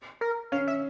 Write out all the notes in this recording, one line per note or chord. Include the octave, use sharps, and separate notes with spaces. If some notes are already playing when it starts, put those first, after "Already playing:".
A#4
C#4 F5
E5